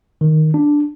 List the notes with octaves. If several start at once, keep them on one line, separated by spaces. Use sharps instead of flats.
D#3
D4